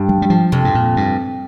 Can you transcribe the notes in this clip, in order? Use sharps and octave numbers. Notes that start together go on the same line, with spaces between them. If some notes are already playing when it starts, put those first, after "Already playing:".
Already playing: G2
G3
G3
F3
F2 C3
G2
A#2
G2